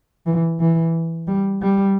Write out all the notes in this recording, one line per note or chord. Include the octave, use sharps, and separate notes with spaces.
E3
E3
G3
G3